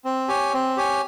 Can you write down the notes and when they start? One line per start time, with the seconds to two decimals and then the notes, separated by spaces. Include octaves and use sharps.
0.05 C4
0.28 G4 C#5 G#5
0.53 C4
0.77 G4 C#5 G#5